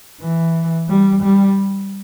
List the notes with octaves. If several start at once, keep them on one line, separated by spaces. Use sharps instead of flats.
E3
G3
G3